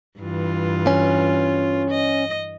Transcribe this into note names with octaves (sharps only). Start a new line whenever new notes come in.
G2 E3 F4
C#4
D#5